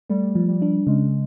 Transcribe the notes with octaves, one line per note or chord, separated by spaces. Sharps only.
G3 A3
F3
G3
D4
C#3 G#3